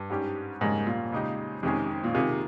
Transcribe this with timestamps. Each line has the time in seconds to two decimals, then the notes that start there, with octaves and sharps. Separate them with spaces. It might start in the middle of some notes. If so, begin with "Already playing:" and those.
Already playing: G2
0.10 G#2 G3 C#4 G4
0.61 F2 G#2 C#3 G3 A#3 C#4
0.87 A#2
1.12 C#3 G#3 D#4 G4
1.63 F2 C3 D#3 G#3 C#4 G#4
2.04 A#2
2.14 C3 D#3 A#3 F4 G#4